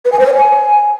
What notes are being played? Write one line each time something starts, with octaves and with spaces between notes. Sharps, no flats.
B4
G#5
C5
C#5
G#5